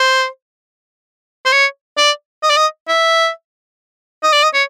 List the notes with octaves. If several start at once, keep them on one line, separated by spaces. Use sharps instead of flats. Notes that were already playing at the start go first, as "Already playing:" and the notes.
Already playing: C5
C5
C#5
D5
D#5
D5
D#5
E5
D#5
D5
D#5
C#5